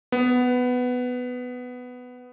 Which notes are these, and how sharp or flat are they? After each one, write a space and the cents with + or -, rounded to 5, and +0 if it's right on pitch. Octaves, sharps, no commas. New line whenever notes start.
B3 +10